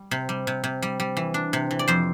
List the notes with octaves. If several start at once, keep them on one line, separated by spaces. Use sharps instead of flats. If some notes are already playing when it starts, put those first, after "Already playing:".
Already playing: G3
C3
G3
C3
C3
G3
G3
E3
D4
C3
E3
D5
F2 C5